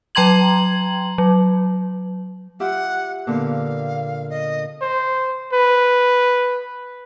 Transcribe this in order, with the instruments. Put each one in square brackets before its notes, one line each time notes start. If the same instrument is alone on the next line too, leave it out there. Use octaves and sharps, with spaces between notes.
[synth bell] F#3 G5 A#5 C6 G#6 F#7
F#3
[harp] F4 G4 E5 [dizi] F#5
[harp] A#2 D3 B3 [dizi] F5
[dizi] D#5
[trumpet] C5
B4